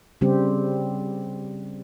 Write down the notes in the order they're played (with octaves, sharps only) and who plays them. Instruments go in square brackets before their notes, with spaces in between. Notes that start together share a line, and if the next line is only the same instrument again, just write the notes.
[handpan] C#3 G3 C4 G4